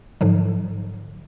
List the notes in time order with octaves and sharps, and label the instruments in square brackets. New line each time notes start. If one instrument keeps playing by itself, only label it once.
[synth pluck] G#2 D3 F3 F#3